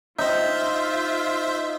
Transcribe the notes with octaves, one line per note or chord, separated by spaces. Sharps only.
D#4 F4 C5 E5